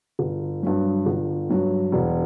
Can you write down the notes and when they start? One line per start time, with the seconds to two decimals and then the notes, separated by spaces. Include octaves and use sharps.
0.19 G1
0.63 G2 F#3
1.06 G1
1.49 G2 F#3
1.92 E1